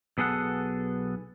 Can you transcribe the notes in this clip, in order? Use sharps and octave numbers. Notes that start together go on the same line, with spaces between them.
B1 B3 G#4 A4 F#5